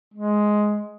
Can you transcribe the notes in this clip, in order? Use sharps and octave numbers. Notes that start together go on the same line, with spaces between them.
G#3